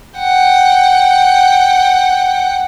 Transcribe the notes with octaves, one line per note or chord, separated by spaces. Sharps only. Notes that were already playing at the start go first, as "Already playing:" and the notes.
F#5 G5